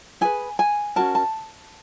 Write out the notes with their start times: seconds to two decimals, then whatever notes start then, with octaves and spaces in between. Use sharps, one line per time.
0.21 E4 G#4 B4 G#5
0.59 G#5
0.96 C#4 F#4 A#4 A5
1.15 A5